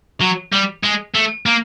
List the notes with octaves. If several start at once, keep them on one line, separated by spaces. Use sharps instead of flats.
F#3
G3
G#3
A3
A#3